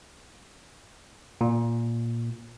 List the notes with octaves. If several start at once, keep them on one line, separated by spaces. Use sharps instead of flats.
A#2